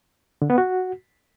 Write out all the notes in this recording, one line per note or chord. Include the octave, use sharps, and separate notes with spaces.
D3
B3
F#4